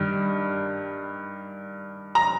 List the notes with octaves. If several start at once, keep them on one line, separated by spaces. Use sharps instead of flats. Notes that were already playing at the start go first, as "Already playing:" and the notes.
Already playing: G2 D#3 G3
A#5